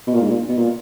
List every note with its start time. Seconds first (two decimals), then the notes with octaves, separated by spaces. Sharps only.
0.07 B2
0.14 A#2
0.21 G#2
0.29 A#2
0.49 B2
0.58 A#2